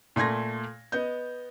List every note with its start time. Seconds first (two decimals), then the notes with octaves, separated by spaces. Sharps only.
0.16 A#2 A3 C6 G#6 A#6
0.92 B3 D#5 G6